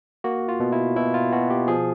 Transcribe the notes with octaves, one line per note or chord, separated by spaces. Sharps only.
A#3 F#4
F4
B2
E4
B2 E4
F4
B2 F#4
G4
F3 G#4